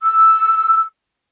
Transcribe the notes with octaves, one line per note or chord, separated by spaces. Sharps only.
E6